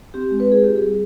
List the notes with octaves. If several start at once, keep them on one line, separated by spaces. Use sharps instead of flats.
C4 G4
G#3
B4
F4 G#4
C4 G4
G#4
G3